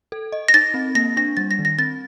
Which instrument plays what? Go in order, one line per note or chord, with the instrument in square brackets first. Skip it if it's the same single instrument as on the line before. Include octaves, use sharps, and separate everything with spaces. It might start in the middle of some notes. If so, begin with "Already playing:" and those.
[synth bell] A4
D#5
[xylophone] A#6
[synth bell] D#4 [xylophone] A6
[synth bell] C4
[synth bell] A#3 [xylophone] A#6
[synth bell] D4 [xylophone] A#6
[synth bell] G3 [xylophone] A6
[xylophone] A#6
[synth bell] D#3
[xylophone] A#6
[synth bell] C4 [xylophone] A6